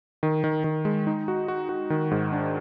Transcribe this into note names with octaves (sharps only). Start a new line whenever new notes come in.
D#3
D#3
D#3
G#3
D#4
F#4
F#4
F#4
D#3
G#2
D4